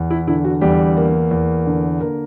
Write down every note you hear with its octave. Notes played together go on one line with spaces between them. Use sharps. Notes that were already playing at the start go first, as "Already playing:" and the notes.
Already playing: E2
E4
D3 E4
F#4
E2 G3 G4
A#3
E2
D3
A#3 A#4